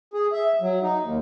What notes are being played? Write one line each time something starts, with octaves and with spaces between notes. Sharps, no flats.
G#4
E5
F#3
D#4
D#2